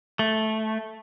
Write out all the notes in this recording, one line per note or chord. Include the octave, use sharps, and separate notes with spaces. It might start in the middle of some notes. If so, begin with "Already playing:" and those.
A3